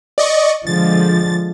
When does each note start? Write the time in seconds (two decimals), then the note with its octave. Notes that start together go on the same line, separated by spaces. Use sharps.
0.18 D5 D#5 C#6
0.67 D3 F3 G#3 A6